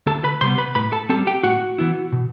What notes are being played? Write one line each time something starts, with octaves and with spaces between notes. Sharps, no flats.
D2 A4 A5
B4 B5
C3 G3 B3 C5 C6
B4 B5
A2 B4 B5
A4 A5
G3 C4 A4 A5
G4 G5
A2 F#4 F#5
E3 B3 E4
B2